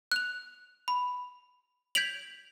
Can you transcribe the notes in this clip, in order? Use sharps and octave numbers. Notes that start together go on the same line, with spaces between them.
F#6 F7
B5
G6 G#6 B6 D7 F7 F#7